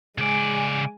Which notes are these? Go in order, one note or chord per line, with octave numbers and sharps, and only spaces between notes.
C#3 G#3 D5 G#5